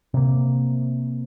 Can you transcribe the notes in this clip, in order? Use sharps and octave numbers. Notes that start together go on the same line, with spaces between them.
C3 A#3